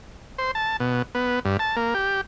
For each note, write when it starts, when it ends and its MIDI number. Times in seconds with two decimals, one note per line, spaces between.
0.38 0.51 72
0.55 0.77 81
0.80 1.02 47
1.15 1.40 59
1.45 1.57 43
1.59 1.76 81
1.76 1.94 58
1.94 2.21 67